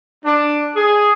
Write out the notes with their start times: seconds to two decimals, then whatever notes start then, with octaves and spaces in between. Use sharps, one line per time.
0.25 D4
0.75 G#4